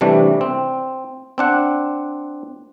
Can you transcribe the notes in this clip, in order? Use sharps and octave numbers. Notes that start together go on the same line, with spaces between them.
C3 E3 G3 A3 D4
C4
C4 D4 F#5